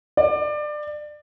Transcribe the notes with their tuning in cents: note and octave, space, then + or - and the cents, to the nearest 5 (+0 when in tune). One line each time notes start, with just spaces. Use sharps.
D5 +25